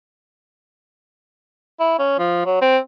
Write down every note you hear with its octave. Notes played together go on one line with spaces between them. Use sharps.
E4
C#4
F3
F#3
C4